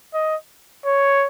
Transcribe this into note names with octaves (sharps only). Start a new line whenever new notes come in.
D#5
C#5